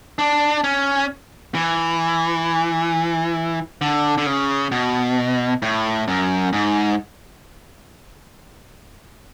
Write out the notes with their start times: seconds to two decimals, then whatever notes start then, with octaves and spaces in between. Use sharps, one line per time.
0.19 D4
0.64 C#4
1.55 E3
3.81 D3
4.18 D3
4.26 C#3
4.72 B2
5.62 A2
6.08 F#2
6.53 G#2